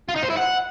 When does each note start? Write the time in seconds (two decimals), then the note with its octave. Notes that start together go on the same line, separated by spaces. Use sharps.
0.09 F4
0.16 D#4
0.23 C5
0.30 E4
0.37 F#5